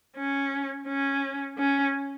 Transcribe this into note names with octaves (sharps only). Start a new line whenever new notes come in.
C#4
C#4
C#4